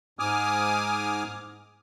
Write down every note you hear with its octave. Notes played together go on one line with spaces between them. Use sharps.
G#2 G#5 D6 D#6 F6